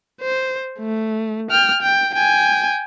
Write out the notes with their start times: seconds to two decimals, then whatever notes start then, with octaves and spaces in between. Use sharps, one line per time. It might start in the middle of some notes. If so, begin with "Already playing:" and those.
0.21 C5
0.79 A3
1.51 G5 F6
1.82 G5
2.14 G5 G#5